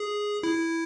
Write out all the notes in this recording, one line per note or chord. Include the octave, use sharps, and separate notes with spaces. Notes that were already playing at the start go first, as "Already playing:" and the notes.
Already playing: G#4
E4